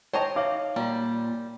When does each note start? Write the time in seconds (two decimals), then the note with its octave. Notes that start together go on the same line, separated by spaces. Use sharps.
0.13 C5 C#5 D#5 G5 A5 A#5
0.36 D#4 C#5 E5 F5 D6
0.76 A#2 G3 F4 A#5